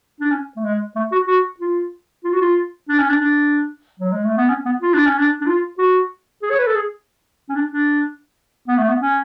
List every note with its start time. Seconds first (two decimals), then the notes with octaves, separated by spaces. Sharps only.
0.20 D4
0.31 C#4
0.56 A3
0.64 G#3
0.96 A3
1.12 F#4
1.28 F#4
1.60 F4
2.24 F4
2.33 F#4
2.41 F4
2.89 D4
2.99 C#4
3.09 D4
3.21 D4
4.00 F#3
4.12 G#3
4.25 A3
4.37 B3
4.49 C#4
4.66 B3
4.82 F4
4.94 D4
5.06 C#4
5.18 D4
5.41 D4
5.46 F4
5.78 F#4
6.42 G#4
6.51 C#5
6.59 B4
6.67 A4
6.75 G#4
7.49 C#4
7.55 D4
7.72 D4
8.68 B3
8.78 A3
8.89 B3
9.00 C#4